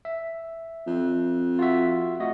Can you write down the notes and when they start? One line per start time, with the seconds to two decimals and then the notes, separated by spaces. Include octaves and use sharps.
0.05 E5
0.87 F2
1.59 F4 F#4 E5
2.20 A3 F#4 D#5